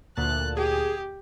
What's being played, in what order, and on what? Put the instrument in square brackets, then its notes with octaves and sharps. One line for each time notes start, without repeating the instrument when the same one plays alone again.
[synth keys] D2 A#2 A5 [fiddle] F#6
[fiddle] G4 [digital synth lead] G#4